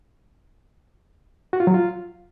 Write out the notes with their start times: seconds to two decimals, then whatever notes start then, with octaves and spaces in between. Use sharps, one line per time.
1.53 F#4
1.60 F4
1.67 F#3
1.74 F4